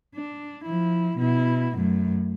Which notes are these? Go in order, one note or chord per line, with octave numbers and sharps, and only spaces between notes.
D4
F3 E4
B2 E4
F#2 A3